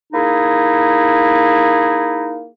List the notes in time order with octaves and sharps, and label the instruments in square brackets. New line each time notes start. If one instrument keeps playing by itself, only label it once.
[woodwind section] A#3 D#4 E4 G#4